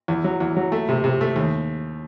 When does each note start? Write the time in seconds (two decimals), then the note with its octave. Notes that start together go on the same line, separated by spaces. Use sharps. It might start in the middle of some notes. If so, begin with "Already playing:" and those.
0.08 E2
0.24 F#3
0.40 E2
0.56 F#3
0.72 A3
0.89 C3
1.04 C3
1.21 A3
1.36 D#2